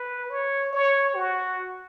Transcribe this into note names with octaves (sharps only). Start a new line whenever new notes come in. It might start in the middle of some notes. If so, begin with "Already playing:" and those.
Already playing: B4
C#5
C#5
F#4